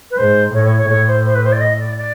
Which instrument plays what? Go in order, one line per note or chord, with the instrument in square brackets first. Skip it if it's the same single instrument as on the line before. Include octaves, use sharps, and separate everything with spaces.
[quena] B4
[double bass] G#2 [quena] C5
[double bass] A2 [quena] C#5
[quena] C#5
C#5
[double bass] A2 [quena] C#5
[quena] C5
C5
B4
C5
D5
D#5
D5
D5